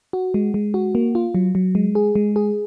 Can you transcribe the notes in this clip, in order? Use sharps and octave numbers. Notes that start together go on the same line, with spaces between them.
F#4
G#3
G#3
F#4
A#3
F4
F#3
F#3
G#3
G#4
G#3
G#4